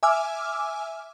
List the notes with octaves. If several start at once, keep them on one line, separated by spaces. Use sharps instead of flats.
E5 G#5 D6 E6 F6